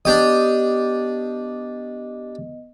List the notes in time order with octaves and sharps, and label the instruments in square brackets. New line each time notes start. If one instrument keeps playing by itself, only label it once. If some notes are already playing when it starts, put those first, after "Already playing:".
[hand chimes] B3 D#5 [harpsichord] D4 G4 D#6